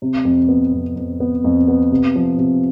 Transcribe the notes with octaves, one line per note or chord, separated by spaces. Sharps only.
C3
F2
B3
F2
F2
B3
F2
B3
C3
F3
C3